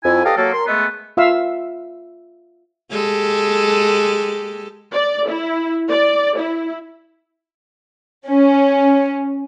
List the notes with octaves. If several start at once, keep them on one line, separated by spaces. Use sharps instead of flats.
F2 E4 G#5
G4 A4 B4 D5 D#5 F5
F#3 A#3 A4
A#4 C6
G#3 A3 B3
F4 E5 F5 E6
G#3 G4 A4
D5
E4
D5
E4
C#4